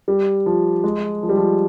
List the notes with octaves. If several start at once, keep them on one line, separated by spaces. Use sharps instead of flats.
G3
F3
G#3
F3
G3
F3